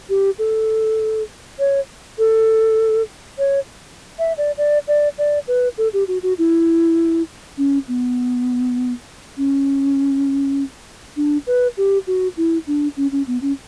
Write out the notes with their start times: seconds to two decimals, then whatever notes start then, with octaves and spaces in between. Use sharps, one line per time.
0.09 G4
0.39 A4
1.59 C#5
2.18 A4
3.38 C#5
4.19 E5
4.38 D5
4.58 D5
4.88 D5
5.18 D5
5.48 B4
5.78 A4
5.93 G4
6.08 F#4
6.23 F#4
6.38 E4
7.58 C#4
7.88 B3
9.37 C#4
11.17 D4
11.47 B4
11.77 G4
12.07 F#4
12.37 E4
12.67 D4
12.97 C#4
13.12 C#4
13.27 B3
13.42 C#4